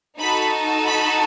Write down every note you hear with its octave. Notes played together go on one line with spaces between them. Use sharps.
D#4 F#4 A4 B5
B5